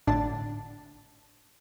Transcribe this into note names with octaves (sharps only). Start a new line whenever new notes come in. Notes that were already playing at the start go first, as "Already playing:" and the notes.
G#1 A2 D3 D4 A5